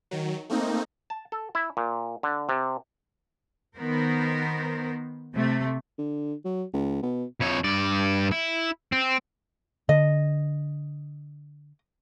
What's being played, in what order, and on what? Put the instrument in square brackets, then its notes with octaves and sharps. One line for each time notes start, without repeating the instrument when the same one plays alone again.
[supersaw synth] D#3 F#3
A3 A#3 C4 D#4
[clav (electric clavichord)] A5
A4
E4
A#2
D3
C3
[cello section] D#3 B3 A#4 C5
C3 A3
[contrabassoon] D3
F#3
C#2
B2
[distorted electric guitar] F2 C#5
G2 D5
E4
C4
[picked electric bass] D3 [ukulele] D#5